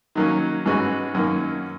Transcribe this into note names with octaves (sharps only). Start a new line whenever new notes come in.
D#3 F#3 A#3 C#4
G#2 E3 G#3 C#4 F#4
F#2 D#3 A#3 C#4